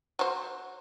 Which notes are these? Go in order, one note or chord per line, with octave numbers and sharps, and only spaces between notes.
F#3 C5